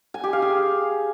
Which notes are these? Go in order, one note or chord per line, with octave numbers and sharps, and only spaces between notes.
G#5
G4
F5
G#4